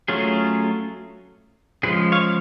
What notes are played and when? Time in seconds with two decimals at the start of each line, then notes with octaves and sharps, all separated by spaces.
0.08 F#3 A3 C#4 F4 G#4
1.83 C#3 F3 G#3 G#4 B4
2.12 C#5 F5